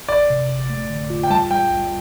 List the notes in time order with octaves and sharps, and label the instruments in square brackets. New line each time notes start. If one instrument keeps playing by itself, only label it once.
[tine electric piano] G1 [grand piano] D5
[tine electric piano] C3
G1
A3
D3
F4
[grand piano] G5
[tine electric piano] G3 [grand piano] A5
[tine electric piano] G3 [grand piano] G5
[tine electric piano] C2